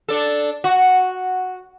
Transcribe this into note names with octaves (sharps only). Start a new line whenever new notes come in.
D4 A4
F#4